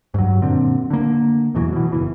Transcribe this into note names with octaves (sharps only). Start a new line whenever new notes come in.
G2 F#3
F#2 A#2 D3 C4
D3 A#3
E2 B2 E3 F#3
B2 E3
F#1 E3